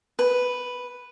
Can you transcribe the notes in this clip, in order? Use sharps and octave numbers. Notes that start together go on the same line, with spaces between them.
B4